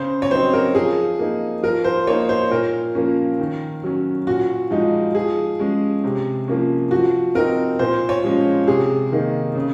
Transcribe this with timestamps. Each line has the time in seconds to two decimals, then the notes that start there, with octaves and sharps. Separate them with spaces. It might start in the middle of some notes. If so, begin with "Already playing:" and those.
Already playing: C#3 C5
0.22 C#5
0.31 F#3 C4 D#4 C5
0.53 A#4
0.75 F3 G#4
1.19 A#3 D#4
1.63 F3 A#4
1.84 C5
2.07 A#3 D#4 C#5
2.29 C5
2.51 A#2 A#4
2.95 F3 A#3 C#4
3.39 D#3
3.83 F#3 C#4
4.27 A#2 F#4
4.71 F3 G#3 D#4
5.15 F3 G#4
5.59 G#3 C#4
6.04 C3
6.48 F3 A#3 C#4
6.91 F3 F#4
7.35 C4 D#4 A#4
7.79 A#2 C5
8.09 C#5
8.24 F3 G#3 C#4
8.67 C3 G#4
9.12 D#3 A#3 D#4
9.55 C#3